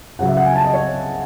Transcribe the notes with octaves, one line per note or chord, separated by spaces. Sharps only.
C#2 C#3 F#3 F#5
E5
F#5
G#5
A5
D#5
C#5